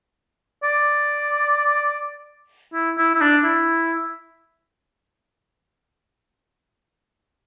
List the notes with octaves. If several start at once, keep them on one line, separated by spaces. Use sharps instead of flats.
D5
E4
E4
E4
D4
E4